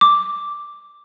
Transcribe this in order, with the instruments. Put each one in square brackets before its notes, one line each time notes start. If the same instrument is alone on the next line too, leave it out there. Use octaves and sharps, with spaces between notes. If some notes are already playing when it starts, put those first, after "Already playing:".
[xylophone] D6